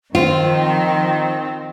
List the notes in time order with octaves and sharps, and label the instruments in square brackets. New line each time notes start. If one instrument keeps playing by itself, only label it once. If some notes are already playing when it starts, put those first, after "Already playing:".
[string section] D#3 F3 [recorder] C4 [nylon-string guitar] F4